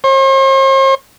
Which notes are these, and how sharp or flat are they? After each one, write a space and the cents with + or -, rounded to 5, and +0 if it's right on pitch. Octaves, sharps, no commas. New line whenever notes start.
C5 +45